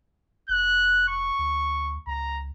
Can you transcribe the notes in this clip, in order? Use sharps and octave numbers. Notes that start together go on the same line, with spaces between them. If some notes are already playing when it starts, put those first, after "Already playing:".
F1 F#6
C#6
D2
C#2 A#5